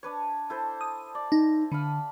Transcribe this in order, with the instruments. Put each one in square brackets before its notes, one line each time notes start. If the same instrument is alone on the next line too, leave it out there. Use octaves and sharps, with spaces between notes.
[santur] D4 B4 C#5
E4 A4 C5
[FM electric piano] D#6
[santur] D5
[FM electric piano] D#4
[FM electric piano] D3 [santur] F5 A5 B5